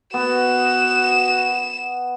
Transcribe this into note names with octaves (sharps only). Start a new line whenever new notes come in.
B3 F#4 E7